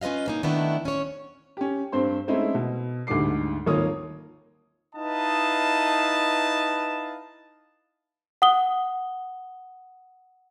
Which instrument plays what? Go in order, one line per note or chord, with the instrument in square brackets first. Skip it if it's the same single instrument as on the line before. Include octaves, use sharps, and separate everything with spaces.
[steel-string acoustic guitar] C#4 F4 B4 D#5 F5
C#3 A#3 D#4
D#3 A3 B3 D4 E4
C#4 C#5
[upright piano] C#4 G4
G2 C4 C5 C6
G#3 A3 C4 C#4 D#4 E4
B2
D2 G#2 D3 G3 D6 C7
G#1 D#2 A#3 F4 C#5 D#6
[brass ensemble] D#4 E4 B4 D#5 F5 A5
[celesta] F#5 D#6 G7